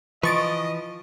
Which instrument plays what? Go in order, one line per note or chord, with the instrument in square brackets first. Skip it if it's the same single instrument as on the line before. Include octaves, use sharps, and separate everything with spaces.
[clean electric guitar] E3 B4 [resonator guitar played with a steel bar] F3 [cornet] D#5 [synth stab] C#6 A6 D7